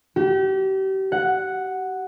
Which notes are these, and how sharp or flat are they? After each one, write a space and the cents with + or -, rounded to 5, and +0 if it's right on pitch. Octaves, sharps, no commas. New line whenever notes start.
G4 -35
F#5 +0